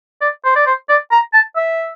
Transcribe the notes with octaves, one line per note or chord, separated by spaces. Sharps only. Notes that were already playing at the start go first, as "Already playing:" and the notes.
D5
C5
D5
C5
D5
A#5
A5
E5